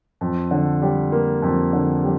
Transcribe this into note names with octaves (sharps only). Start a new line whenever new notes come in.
F2
D3
G3
A#3
F2
D3
G3